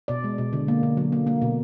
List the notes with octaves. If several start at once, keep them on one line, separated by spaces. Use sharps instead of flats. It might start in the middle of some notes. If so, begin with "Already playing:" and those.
B2 D5
G#3
B2
D3
A#3
D3
F#3
A#3
A#3
B2